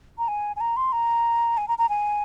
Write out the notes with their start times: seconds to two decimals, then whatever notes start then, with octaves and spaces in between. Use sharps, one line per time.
0.18 A#5
0.28 G#5
0.56 G#5
0.60 A#5
0.77 C6
0.92 A#5
1.57 G#5
1.68 A#5
1.78 A#5
1.89 G#5